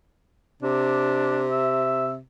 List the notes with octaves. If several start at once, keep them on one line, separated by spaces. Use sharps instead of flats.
C3 D4
E5